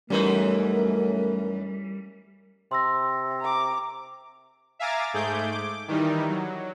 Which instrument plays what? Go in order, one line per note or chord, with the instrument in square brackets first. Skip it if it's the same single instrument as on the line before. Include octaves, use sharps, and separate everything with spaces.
[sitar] F#2 E3 D#4 [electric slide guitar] G3 [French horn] A3 [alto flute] A#4
[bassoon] C3 [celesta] C6 E6 A#6
[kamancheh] A#5 D6
[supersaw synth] E5 F5 G#5 A#5 D6 A6
G#2 A3 G#4 D6 G6
D6
D#3 E3 G3 D#4
F#3